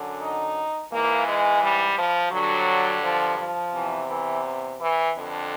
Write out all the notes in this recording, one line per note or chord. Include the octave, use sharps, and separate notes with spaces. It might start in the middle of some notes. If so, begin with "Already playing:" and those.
Already playing: F#2 D3
D#4
G#2 E3 A#3
G#3
G3
F3
G2 D3 F#3
F3
F3
E2 C3 E3
E3
E3
F2 D3